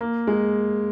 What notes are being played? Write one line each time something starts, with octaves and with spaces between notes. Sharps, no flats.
A#3
G#3